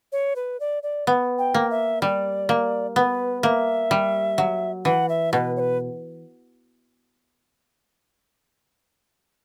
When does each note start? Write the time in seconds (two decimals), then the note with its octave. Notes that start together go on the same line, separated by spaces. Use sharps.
0.12 C#5
0.36 B4
0.60 D5
0.83 D5
1.07 B3
1.38 G5
1.54 A#3
1.71 E5
2.02 G3 D5
2.49 A#3
2.96 B3 B4
3.43 A#3 E5
3.91 G3
4.38 F#3
4.85 E3 F#5
5.09 E5
5.33 B2 B4
5.56 C#5
5.60 B4